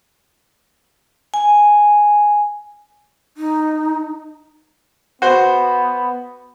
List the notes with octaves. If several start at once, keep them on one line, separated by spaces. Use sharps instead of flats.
G#5
D#4
B3 F#4 C5